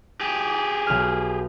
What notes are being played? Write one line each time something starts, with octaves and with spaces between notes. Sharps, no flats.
G4 G#4
B1 F6